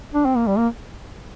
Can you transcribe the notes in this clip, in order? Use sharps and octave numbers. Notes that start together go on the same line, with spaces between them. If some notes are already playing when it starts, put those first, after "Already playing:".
D4
C4
A#3
G3
A#3